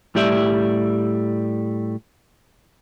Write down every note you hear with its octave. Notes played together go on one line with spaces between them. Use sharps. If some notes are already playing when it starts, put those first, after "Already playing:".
A2 G3 G4 D5 E5